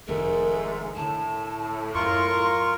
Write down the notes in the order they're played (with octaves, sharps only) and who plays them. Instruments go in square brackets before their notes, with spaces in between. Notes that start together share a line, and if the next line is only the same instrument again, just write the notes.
[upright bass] F1 D#3 [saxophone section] G#2 G#3 A3 [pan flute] A#4
[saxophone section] A2 [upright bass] D3 [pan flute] A5
[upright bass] F#2 [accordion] F4 A#4 C#6 [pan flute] C6